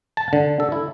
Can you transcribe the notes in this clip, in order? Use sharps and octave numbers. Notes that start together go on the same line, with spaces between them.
A5
D3
A4
E4